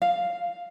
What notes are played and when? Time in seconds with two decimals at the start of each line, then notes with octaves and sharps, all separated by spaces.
0.02 F5